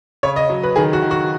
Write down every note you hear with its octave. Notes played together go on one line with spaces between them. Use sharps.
C#3 C#5
D#5
F#3
B4
D#3 G#4
F#4
D#3
F#4